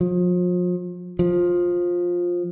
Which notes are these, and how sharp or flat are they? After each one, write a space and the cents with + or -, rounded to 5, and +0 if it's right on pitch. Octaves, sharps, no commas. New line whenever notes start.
F3 +40
F3 +15